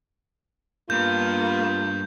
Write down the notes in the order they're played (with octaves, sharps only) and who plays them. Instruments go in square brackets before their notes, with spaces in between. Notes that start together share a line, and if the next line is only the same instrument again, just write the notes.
[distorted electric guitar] G2 [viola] A#3 B3 [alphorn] F4 [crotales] G6